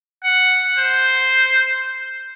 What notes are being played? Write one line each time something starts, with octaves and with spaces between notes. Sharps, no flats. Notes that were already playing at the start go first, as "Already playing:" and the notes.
F#5
C5